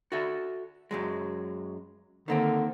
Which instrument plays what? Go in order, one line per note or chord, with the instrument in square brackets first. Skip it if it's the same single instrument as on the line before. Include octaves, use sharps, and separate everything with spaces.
[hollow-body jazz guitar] F#4 A4 E5
F#2 F#3 G#3
[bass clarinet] D3 [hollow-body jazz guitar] D#3 A#3 C4